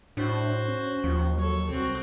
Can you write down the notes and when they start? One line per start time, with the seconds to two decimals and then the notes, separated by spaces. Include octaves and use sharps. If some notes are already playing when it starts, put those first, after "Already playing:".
0.17 A2 D4 F#4 C5
0.68 C#4
1.04 D#2 F3
1.38 F#3 A4 C#5
1.70 C2 C4 F#4